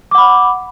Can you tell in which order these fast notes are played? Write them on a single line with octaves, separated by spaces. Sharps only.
D6 F#5 B5